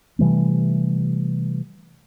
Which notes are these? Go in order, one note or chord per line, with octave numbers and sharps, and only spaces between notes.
C3 E3 G3 A3